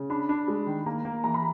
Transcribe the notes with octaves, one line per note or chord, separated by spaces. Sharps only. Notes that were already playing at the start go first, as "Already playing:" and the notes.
Already playing: C#3
D4 B5
D4
G#3
D#3
A#3 A#5
A#3
E3 A#5
B5